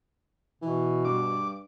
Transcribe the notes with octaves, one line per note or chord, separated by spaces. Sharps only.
B2 E3
G2 D6